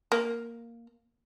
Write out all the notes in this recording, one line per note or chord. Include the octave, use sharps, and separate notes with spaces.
A#3